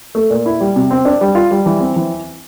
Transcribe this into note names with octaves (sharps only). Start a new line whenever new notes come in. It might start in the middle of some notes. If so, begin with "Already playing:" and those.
A3
A#2
E4
G3
C3
C4
D4
G3
F4
G3
E3
C4
E3